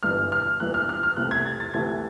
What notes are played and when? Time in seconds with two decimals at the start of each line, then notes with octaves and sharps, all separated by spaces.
0.03 G1 G2 E3 F6
0.32 F6
0.60 G1 G2 E3 F#6
0.74 F6
0.89 F6
1.03 F6
1.16 C2 C3 E3 A3 F#6
1.31 G#6
1.46 A6
1.60 A6
1.74 C2 C3 E3 A3 G#6